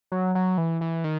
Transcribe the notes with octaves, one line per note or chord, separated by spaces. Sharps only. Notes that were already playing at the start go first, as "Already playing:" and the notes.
F#3
F#3
E3
E3
D#3